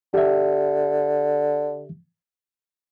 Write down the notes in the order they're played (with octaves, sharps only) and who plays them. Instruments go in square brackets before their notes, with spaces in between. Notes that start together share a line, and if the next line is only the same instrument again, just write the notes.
[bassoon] D3 [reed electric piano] G4 E5